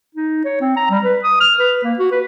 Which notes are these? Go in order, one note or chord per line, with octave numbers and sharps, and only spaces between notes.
D#4
C#5
C4
A#5
G3
B4
D#6
F6
B4
A#3
F#4
B4